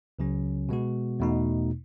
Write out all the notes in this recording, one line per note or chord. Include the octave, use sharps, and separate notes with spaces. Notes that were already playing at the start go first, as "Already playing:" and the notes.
C#2 C#3 F#3 C#4
B2 G#3 B3 F#4
E2 B2 A3 D#4